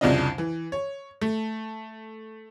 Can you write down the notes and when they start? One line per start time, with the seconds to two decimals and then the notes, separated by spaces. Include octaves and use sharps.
0.01 C2 F2 C#3 D4 F4 D#5
0.38 E3
0.72 C#5
1.21 A3